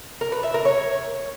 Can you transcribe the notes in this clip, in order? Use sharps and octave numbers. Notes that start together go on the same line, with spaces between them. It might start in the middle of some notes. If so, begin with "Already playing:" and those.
A#4
B4
E5
A#4
C#5